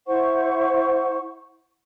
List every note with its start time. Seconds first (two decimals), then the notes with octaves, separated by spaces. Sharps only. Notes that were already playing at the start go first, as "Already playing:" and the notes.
0.07 E4 C5 F#5 C#6